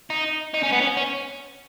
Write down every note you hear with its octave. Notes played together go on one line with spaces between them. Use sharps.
D#4
D#4
C#4
B3
C#4
C#4